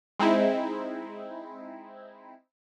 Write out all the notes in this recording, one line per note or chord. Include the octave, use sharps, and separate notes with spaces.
G#3 C4 D#4 E4